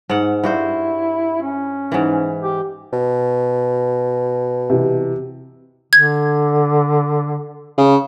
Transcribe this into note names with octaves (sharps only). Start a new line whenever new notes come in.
G#2 F#5
G2 E4 F#4 C5
C#4
G#2 E3
G4
B2
C3 E3
D3 G#6
C#3